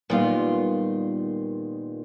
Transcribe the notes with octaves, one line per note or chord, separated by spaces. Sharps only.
A#2 D#3 G3 B3 F4